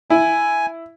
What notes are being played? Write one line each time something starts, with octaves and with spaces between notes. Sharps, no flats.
E4 G#5